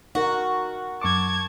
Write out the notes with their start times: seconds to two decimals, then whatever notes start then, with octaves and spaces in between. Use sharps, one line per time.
0.15 D#4 F#4 A#4
1.02 F#2 A5 C#6 D6 G#6